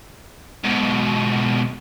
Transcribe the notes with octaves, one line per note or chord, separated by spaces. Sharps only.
G#2 B2